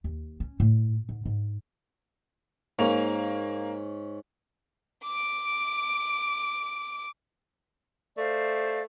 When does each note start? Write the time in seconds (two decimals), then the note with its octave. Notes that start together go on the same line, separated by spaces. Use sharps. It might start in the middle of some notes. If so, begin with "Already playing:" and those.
0.04 D#2
0.40 C#4
0.60 A2
1.09 G#2
1.25 G#2
2.79 G#2 A#3 C#4 F7
5.03 D6 D7
8.18 A3 C5 D5 F5